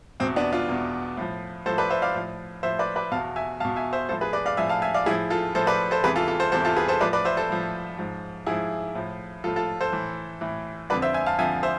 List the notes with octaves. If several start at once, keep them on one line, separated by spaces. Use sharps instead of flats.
E2 B2 C4
B3 D4
D4 F4
E2 B2
A2 F3
A2 F3 A4 C5
B4 D5
C5 E5
D5 F5
A2 F3
A2 F3 C5 E5
B4 D5
B4 D5
E2 B2 F5 A5
E5 G#5
E2 B2 F5 A5
E5 G#5
C5 E5
A2 F3 A4 C5
G#4 B4
B4 D5
D5 F5
A2 F3 E5 G#5
F5 A5
E5 G#5
D5 F5
A2 F3 E4 G#4
F4 A4
A2 F3 A4 C5
B4 D5
A4 C5
E2 C3 E3 G#4 B4
F4 A4
F4 A4
A4 C5
E2 C3 E3 A4 C5
F4 A4
G#4 B4
A4 C5
A2 F3 B4 D5
B4 D5
C5 E5
A4 C5
A2 F3
G#2 F3
G#2 F3 E4 G#4
A2 F3
A2 F3 F4 A4
F4 A4
A4 C5
A2 E3
A2 E3
F2 D3 F3 B4 D5
C5 E5
E5 G#5
F5 A5
F2 D3 F3 E5 G#5
C5 E5